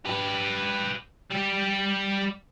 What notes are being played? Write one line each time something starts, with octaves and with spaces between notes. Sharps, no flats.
G4 B4
G3 G4